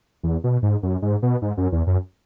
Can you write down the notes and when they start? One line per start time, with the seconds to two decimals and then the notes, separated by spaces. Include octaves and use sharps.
0.23 E2
0.44 B2
0.62 G#2
0.83 F#2
1.02 G#2
1.22 B2
1.42 G#2
1.57 F#2
1.72 E2
1.87 F#2